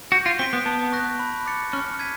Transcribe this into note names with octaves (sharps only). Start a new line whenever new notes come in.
F#4 G6
F4
C4 B6 D7
B3
B3 A5
C#6 F#6 A#6
B5
D6 F#6 A6 C#7
C#4 F6
G#6 B6 D#7